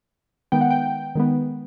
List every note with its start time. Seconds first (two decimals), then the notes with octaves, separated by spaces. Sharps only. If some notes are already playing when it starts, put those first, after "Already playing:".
0.52 D#3 G#3 B3 G5
0.61 F#5
0.70 G5
1.15 D#3 G#3 B3